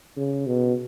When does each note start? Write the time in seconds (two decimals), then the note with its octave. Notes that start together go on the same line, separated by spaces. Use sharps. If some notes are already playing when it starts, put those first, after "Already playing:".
0.17 C#3
0.47 B2